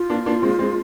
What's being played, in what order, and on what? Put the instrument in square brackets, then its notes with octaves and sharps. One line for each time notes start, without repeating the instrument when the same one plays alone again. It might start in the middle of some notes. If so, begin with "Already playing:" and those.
Already playing: [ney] F4
[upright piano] A#3 D4
A#3 D4
G#3 C4
G#3 C4